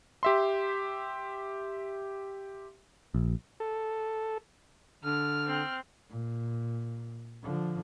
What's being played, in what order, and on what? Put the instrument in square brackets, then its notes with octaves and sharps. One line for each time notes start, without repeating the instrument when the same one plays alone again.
[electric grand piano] G4 E5 C6
[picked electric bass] A#1
[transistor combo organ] A4
[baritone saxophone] D3 [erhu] F6
[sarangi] C4
[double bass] A#2
D3 F3